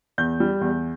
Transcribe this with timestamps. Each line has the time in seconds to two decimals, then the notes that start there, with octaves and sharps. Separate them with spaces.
0.18 E2 G6
0.40 G3
0.61 E2